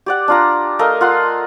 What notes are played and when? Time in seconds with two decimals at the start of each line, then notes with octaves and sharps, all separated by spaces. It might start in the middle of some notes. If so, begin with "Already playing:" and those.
0.06 G4 D5 F#5
0.28 D4 F4 A#5
0.79 A3 A#4 D#5 F5
1.01 F4 F#5 C6